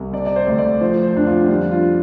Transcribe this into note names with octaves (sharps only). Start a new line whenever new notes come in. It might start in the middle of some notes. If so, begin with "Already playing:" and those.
Already playing: C2
C3 D5
D5
C5
D2
D5
F3 C5
C5
F2 D4
F4
G3 D4
F4